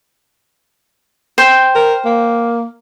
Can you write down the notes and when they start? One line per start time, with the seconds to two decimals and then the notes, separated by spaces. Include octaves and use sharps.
1.38 C5 G5
1.75 A#4
2.05 A#3